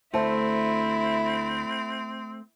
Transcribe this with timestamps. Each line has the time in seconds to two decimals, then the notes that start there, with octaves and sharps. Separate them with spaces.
0.14 D2 A3 C4 E4 C5 A5